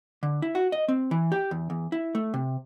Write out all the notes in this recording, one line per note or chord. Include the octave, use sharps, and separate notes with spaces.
D3
E4
F#4
D#5
C4
E3
G4
E2
E2
E4
A3
C3